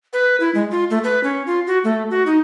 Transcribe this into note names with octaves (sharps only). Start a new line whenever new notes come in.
B4
E4
G#3
F4
A3
B4
C#4
F4
F#4
A3
F#4
D#4